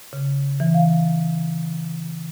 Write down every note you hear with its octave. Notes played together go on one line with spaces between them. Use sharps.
C#3
E3
F5